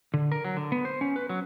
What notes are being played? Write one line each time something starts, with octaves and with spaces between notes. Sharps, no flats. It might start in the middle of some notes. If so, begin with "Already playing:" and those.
D3
A#4
F#3
D3
B3
C5
C#4
B4
F#3